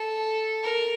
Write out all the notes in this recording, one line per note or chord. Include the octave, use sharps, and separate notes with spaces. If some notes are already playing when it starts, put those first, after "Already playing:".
Already playing: A4
A#4